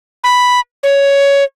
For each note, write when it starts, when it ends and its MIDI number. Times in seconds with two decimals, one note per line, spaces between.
0.24 0.60 83
0.83 1.44 73